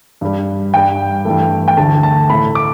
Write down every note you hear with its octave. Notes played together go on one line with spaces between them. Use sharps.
G2 G3
G2 G3 G5
G2 E3 A3
G5
D2 D3 A3 A5
A5
A2 A3 B5
D6